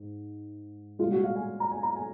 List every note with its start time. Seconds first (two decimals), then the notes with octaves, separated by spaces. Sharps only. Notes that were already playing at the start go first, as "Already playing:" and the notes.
Already playing: G#2
0.99 C2 A#2 G#3 F4
1.12 F#4
1.24 F5
1.36 G#5
1.60 A#5
1.72 G#5
1.83 A#5
1.96 G#5